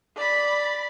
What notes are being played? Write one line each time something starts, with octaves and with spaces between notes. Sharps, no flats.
D5 B5